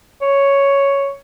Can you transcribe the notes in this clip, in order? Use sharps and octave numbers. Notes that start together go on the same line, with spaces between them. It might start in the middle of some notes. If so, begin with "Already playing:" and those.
C#5